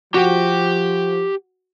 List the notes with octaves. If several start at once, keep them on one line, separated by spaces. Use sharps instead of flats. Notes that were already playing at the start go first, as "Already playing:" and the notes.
F3 F#4 G4 G5